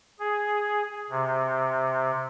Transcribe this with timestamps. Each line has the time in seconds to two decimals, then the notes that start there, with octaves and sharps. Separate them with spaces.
0.20 G#4
1.10 C3